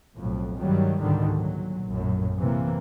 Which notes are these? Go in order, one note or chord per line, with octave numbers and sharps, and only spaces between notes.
B1 F2 A2
G2 D#3 F#3 G3
C#2 G#2 B2 D3 D#3 G3
A#2 F#3
A#1 F#2 A2
C3 E3 A#3